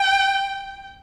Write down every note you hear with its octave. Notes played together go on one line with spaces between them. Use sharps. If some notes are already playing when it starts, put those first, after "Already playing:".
Already playing: G5